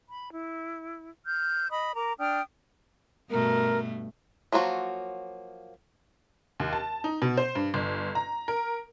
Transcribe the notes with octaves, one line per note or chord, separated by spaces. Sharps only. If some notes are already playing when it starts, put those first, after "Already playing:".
B5
E4
F6 G6
D#5 B5 D#6
A#4 A#5 D6
D4 G5 D#6 F6
G2 B2 A3 A#4
F3 F#3 A#3 F4 F#4
D#2
A5
D#4
B2
C5
G2
G1
A#5
A#4